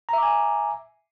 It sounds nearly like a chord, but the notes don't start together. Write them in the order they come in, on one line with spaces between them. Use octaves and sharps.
A#5 E5 D6 G#5